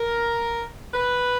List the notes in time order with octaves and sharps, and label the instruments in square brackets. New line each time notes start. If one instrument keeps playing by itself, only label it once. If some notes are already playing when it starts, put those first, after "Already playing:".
Already playing: [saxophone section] A#4
B4